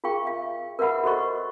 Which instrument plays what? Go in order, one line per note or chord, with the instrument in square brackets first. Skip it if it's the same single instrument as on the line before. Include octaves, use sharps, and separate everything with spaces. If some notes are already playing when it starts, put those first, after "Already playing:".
[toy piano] F4 G#4 A#4 F5 G5 C#6
E5 F5
A#4 B4 E5 F#5 B5
F#4 A4 C5 D#5 C#6